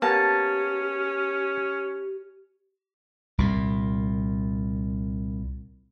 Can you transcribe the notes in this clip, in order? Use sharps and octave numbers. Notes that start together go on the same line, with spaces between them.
A#3 B3 C#4 G4 A5
C2 A#2